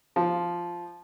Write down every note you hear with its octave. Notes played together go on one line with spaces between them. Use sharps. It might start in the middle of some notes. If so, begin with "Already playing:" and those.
F3